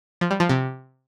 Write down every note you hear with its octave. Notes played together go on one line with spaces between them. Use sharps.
F3
G3
F3
C3